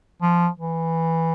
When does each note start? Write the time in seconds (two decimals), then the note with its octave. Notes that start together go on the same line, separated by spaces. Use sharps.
0.22 F3
0.59 E3